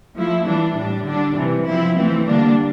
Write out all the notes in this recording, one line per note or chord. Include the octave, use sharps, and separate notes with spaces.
F3 A3 E4
E3 G3 D4
A2 G3 D4
D3 G3 D4
C3 E3 G3
F3 C4 E4
E3 A3 C4
D3 G3 A#3 D4